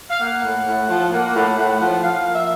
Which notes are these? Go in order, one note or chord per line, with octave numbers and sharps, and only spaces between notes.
F5
A#3 F#5
A2
A2
F3
A#3
A2
A2
F3
F3 F5
A#3
E5